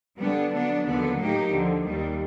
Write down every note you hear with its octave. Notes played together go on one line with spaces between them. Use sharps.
D3 G3 B3 D4
F#3 B3 D4
D#2 D3 F#3 B3
A2 F#3 A#3 D#4 G4
D#2 D3 F3
D#2 D#3 G3